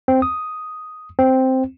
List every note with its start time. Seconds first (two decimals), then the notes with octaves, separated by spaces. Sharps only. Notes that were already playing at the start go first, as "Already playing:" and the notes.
0.08 C4
0.22 D#6
1.19 C4